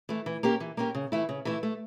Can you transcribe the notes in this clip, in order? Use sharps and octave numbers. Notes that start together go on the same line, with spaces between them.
E3 A3
E3
A#3 C#4 G4 A#4
E3
A#3 C#4 G4 A#4
C#3
E3 A3 E4
C#3
E3 A3 E4
A3